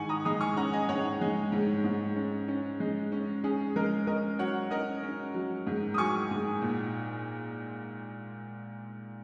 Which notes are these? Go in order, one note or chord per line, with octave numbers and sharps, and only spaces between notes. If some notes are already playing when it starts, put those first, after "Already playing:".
Already playing: G#2 D#3 F#5 G#5 C#6
A#5 D#6
G#3 A#5 D#6
G#5 C#6
C#4 F#5 A#5
D#5 G#5
G#2 C#5 F#5
G#3
G#2
G#2
C#4
C#4
G#3
C#4
C#4 G#4
G#3 A#4
C#4 A#4 D#5
F#3 C#5 F#5
C#4 A#4 D#5
C#4
F#3
G#2
D#6
F#3 G#5 C#6
G#2
A#2